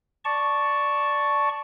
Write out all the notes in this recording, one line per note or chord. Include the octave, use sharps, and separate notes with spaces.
D5 A5 C#6